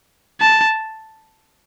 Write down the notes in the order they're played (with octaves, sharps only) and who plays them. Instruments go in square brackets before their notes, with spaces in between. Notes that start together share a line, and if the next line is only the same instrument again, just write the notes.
[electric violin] A5